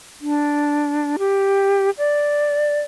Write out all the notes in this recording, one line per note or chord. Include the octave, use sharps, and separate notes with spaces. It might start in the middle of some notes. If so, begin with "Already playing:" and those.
D4
G4
D5